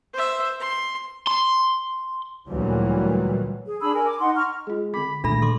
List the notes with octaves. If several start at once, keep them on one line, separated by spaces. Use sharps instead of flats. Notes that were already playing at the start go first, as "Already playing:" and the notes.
C5 E5
C6
C6
D2 A#2 E3 F#3 G3
G#4
D4 G#4 B5 E6
A#4 G#5
D6
D#4 F#5 C6
A#5 C#6 F6
G#3 F4 G#4
D3 C4 B5 D6
A#2 D#3 A3 D4 A4 B5 A#6
D3 A4 C6 D6